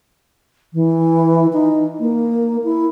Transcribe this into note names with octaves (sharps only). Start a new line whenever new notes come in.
E3
D#4
A#3
E4